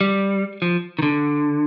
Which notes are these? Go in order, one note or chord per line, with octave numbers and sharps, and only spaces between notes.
G3
F3
D#3
D3